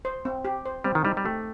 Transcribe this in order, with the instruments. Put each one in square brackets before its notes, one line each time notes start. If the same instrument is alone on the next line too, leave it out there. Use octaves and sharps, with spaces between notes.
[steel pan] C5
C4
G4
C5
[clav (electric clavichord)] G3 [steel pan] C4
[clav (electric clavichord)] D#3
[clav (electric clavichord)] G3 [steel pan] D#4
[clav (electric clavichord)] G3
[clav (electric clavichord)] A3 [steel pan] G4